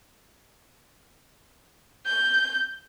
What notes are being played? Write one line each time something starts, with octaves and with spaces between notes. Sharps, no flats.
G6